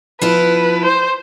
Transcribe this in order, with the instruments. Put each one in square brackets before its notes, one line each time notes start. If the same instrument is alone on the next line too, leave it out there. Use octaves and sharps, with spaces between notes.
[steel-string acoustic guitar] F3 B3 E4 [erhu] B4
[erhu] C5